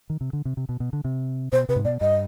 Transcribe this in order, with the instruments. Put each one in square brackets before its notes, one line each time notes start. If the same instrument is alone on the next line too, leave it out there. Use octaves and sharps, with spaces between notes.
[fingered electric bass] D#3
C3
D3
C3
C3
B2
B2
D3
C3
[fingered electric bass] B2 [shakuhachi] C5
[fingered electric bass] C3 [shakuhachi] B4
[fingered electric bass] G#2
[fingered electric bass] B2 [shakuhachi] D5
[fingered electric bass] G2 [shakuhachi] D#5